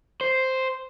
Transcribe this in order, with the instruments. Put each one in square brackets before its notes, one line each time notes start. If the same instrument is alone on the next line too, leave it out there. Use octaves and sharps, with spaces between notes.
[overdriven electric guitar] C5